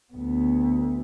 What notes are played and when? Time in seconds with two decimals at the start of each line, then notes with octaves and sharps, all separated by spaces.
0.13 D2 B3